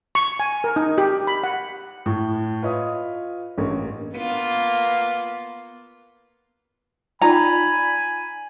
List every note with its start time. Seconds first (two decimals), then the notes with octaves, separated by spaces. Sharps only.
0.15 C#6
0.40 G#5
0.64 A#4
0.76 D#4
0.98 G4
1.27 B5
1.44 F#5
2.06 A2
2.63 F4 B4 C#5 D#5 E5 D#6
3.58 A1 G2 A#3 C#5
4.16 A#3 B3 F4
7.22 D#4 F4 D5 G#5 A#5 B5